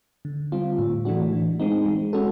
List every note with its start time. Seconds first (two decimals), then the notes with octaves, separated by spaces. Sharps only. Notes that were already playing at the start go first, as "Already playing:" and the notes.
0.25 D3
0.52 G3 C4 F4
0.79 A2
1.05 E3 A3 D4 F#4
1.32 E3
1.60 G#3 C4 D#4
1.86 G#3
2.13 C#4 F#4 A4